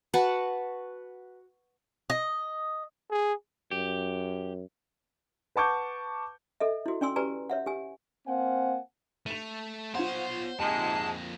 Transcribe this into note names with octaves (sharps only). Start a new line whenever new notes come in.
F#4 B4 F#5 A5
D#5
G#4
F#2 G4
B4 F#5 A5 C#6 D6 G6
A4 D#5 E5
E4 F#4
C#4 D5 G#5 C6 E6
G4 B4 D5 G#5 A#5
C#5 E5 F#5
G4 G#5
A#3 C4 C5 F5 F#5 G#5
A3 D#7 F7
B3 F4 C5 C#5 F#5
F2 G#2 C3 G#3 A#3 A5